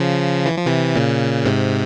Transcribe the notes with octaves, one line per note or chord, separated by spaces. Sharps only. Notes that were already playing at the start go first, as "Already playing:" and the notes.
Already playing: C#3 F3
E3
F3
C3 E3
A#2 C#3
G#2 C3